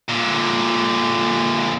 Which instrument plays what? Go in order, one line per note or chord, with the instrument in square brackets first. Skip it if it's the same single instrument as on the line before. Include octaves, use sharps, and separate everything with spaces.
[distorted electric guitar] A#2 D3